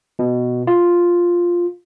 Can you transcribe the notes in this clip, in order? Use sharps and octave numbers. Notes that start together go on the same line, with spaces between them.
B2
F4